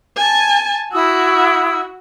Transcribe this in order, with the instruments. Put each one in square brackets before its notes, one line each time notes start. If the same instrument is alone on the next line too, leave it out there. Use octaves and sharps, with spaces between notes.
[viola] G#5 A5
[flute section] E4 D#6 E6 [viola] F#4